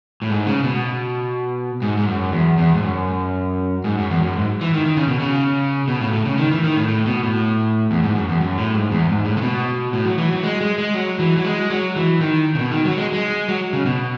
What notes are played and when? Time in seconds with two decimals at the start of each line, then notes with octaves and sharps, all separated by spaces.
0.22 A2
0.30 G#2
0.47 C#3
0.63 B2
1.82 G#2
1.97 G#2
2.08 F#2
2.32 E2
2.58 E2
2.74 G#2
2.83 F#2
3.84 G#2
3.98 F#2
4.11 E2
4.22 F#2
4.35 G#2
4.61 E3
4.74 D#3
4.86 D#3
4.97 C#3
5.08 B2
5.20 C#3
5.88 B2
6.01 A2
6.13 A2
6.25 C#3
6.38 D#3
6.51 E3
6.64 D#3
6.76 A2
6.88 A2
7.06 B2
7.23 A2
7.91 E2
8.03 G#2
8.15 F#2
8.29 E2
8.40 F#2
8.58 A2
8.74 G#2
8.91 E2
9.09 G#2
9.25 A2
9.37 C#3
9.42 B2
9.93 A2
10.06 F#3
10.18 E3
10.32 F#3
10.43 G#3
10.61 G#3
10.78 G#3
10.94 F#3
11.19 E3
11.37 F#3
11.45 G#3
11.70 F#3
11.96 E3
12.21 D#3
12.55 C#3
12.59 B2
12.71 D#3
12.85 F#3
12.98 G#3
13.13 G#3
13.48 F#3
13.73 C#3
13.86 B2